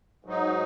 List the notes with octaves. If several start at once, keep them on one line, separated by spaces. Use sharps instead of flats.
G#2 F#3 D#4